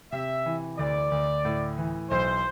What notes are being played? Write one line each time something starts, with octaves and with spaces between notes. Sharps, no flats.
C3 E5
E3
D2 D5
D2
A2
E3
B1 C5